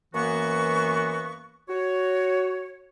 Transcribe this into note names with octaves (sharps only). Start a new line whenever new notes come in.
F#2 E3 A#3 B3 F#4 C#6
F#4 C#5